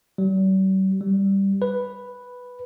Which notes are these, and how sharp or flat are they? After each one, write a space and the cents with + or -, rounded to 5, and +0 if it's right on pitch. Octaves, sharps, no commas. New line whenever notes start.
G3 -45
G3 +0
B4 +0